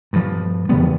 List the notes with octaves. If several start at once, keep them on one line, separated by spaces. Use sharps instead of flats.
G2 F3
E2 C#3 G3 B3